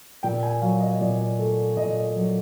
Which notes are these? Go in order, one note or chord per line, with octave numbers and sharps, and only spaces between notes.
A#2 G5
G#5
F#3 F5
D#5
A#2 D5
A3
A#2 D#5
F#3